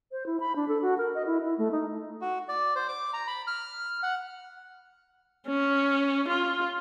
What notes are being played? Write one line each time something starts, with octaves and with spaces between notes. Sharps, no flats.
C5
E4
B5
D4
A4
F#4
A#4
D#5
E4
E4
A3
D#4
F#4
D5
C5
D6
A#5
B5
F6
F#5
C#4
F4